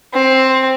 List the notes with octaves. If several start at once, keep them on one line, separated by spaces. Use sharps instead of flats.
C4